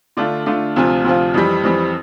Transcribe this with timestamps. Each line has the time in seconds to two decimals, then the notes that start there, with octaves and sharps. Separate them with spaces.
0.17 D3 A3 D4 F4
0.46 D3 A3 D4 F4
0.76 D2 C3 F3 C4 F4
1.05 D2 C3 F3 C4 F4
1.34 F2 E3 G3 C4
1.64 F2 E3 G3 C4